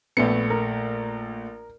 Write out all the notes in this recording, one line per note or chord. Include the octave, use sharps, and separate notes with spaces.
A#1 A3 B3 C#7
A#4